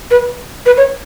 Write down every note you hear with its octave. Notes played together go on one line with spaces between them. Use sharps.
B4
B4
C#5